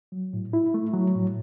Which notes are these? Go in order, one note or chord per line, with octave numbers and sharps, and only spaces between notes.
F#3
A2
E4
A3
F#3
A2